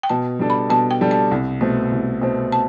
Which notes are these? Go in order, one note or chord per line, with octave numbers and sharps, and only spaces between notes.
G5
B2 A5
G3 D4 A4
B5
B2 A5
G5
G3 D4 A4
A5
C2
B2 A3 C4
C2
B2 A3 C4
A5